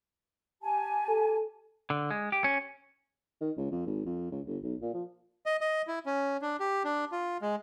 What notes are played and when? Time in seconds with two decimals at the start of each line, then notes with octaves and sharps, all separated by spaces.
0.63 G4 G#5 A5
1.09 A4
1.90 D3
2.11 G#3
2.32 G4
2.44 C#4
3.41 D#3
3.56 C#2
3.71 F2
3.86 G#1
4.06 F2
4.31 C#2
4.46 G1
4.63 B1
4.81 A#2
4.93 F3
5.46 D#5
5.61 D#5
5.87 E4
6.06 C#4
6.42 D4
6.60 G4
6.85 D4
7.12 F4
7.42 G#3